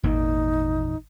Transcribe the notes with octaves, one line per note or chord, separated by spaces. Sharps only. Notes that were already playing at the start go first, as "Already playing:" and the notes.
G#1 E2 A#2 A#3 D#4